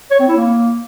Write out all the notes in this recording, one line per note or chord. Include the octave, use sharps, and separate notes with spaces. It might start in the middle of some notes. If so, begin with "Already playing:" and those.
C#5
C4
E4
A#3